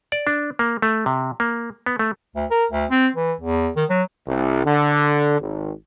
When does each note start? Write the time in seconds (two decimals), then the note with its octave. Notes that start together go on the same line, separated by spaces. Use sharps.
0.12 D5
0.27 D4
0.59 A#3
0.82 A3
1.06 C3
1.40 A#3
1.86 B3
1.99 A3
2.36 D2
2.51 A#4
2.71 D2
2.91 C4
3.16 E3
3.41 E2
3.76 D#3
3.90 F#3
4.26 C2
4.65 D3
5.39 G#1